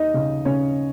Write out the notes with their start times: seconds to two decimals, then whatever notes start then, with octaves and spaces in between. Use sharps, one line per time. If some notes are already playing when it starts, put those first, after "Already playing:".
Already playing: D#2 D#4 D#5
0.14 C#3
0.45 C#3 C#4 C#5